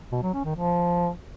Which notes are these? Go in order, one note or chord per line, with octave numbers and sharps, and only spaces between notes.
B2
F#3
C#4
D#3
F3